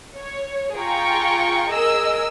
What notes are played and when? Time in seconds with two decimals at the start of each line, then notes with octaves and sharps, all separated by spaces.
0.17 C#5
0.77 F4 G#4 G5 A#5 C#6
1.70 G#4 A#4 D#5 E6